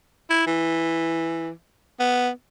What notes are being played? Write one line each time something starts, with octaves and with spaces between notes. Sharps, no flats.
E4
E3
B3